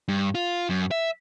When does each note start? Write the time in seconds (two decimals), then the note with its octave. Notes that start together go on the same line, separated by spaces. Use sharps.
0.08 G2
0.35 F4
0.69 F#2
0.91 E5